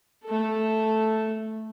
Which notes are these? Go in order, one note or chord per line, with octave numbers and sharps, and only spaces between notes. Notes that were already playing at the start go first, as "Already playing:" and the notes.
A3 A4